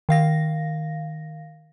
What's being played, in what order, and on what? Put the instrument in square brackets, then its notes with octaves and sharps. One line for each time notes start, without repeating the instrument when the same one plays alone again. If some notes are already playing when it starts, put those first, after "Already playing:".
[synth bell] D#3 F5 A#6